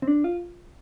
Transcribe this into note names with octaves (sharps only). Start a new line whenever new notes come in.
C4
D4
F4